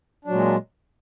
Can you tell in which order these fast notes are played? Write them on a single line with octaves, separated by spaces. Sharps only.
D4 F#3 A#2 G#3